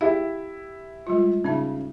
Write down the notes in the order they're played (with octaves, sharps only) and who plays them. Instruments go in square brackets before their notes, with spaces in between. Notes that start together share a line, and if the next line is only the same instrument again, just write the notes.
[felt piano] E4 G4 E5 [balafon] F5
[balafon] G3 G#3 F4
[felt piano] C#3 [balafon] C#4 D#4 E5